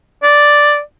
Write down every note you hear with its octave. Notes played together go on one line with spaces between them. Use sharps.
D5